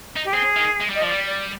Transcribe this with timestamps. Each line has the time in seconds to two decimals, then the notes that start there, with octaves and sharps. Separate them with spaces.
0.16 D#4
0.25 G4
0.32 C4 G#4
0.56 D#3
0.80 G#3
0.90 G3
0.95 D#5
1.01 F3 D5
1.10 G3
1.26 D5